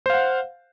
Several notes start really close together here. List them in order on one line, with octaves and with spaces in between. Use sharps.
C5 F5 F#5